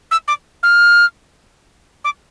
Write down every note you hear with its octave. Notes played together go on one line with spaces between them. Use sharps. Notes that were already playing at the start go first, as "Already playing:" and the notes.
E6
D6
F6
D6